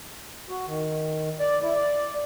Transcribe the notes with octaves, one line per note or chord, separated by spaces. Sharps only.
F#4
D#3
D5
E4
D5